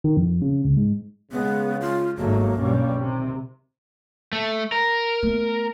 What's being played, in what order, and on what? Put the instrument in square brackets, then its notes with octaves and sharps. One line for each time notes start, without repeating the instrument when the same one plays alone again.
[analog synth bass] D#3
F2
C#3
C#2
G#2
[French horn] C#3 [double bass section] G#3 [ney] B3
[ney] F4
[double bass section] G1 G#2 A3 [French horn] F#3 [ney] A#3
[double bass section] B1 G2 G3 [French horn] C#4
[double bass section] C3 D#3
[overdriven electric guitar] A3
A#4
[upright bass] A3 B3